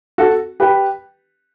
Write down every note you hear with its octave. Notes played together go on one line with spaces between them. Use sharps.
F#4 A4
G4 B4